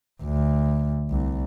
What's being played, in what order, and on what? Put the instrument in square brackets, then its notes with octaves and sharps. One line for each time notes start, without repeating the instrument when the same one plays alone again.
[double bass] D2
C2